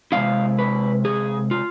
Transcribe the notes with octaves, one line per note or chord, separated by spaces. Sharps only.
C3 G#3 B3 E4 F5
B4
G#4
F4